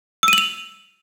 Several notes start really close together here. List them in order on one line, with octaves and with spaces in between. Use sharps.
E6 D#7 F#7 F7